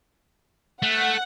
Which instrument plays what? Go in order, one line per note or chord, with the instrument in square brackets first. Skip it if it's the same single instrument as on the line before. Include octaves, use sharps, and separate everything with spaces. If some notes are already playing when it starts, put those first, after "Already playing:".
[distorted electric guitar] A3 [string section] F#5